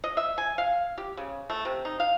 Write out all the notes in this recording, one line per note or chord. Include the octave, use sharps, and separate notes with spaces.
D#5
E5
G#5
F5
G4
C#3
A3
C3
D#4
F5